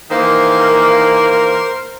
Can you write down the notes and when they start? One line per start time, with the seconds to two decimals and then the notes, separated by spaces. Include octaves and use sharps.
0.11 D#3 E3 A#3 C5
0.59 A#4